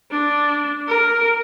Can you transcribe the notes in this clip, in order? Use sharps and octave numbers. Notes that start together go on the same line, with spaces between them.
D4
A#4